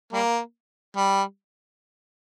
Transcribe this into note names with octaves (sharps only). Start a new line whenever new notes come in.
G3 A#3
G3